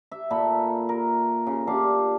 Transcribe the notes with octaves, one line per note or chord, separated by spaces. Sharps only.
E5
A#2 A4 B5
A#4
C#3
D4 F4 G4 F5